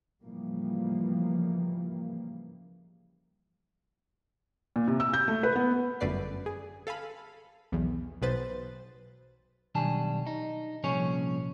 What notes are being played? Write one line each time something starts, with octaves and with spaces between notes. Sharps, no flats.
A2 C#3 E3 F3 G3 A#3
A#2
C3
E6
G6
A3
B4
B3
G1 F#2 A3 B4 D5 C7
G#4
A4 F5 G#5 B5
B1 E2
B1 B2 B4 C5 A6
B1 D#3 G3 D4 G#5 A5
D#4
C2 A#2 F3 C#4 G#4 C#5